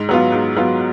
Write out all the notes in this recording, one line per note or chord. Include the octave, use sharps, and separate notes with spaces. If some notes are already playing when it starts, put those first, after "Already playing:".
Already playing: G#2
F#3 B3 F4
G#2
F#3 B3 F4